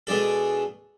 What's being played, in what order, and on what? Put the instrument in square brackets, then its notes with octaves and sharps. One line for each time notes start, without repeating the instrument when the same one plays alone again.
[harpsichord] B2 G#3 D4 A4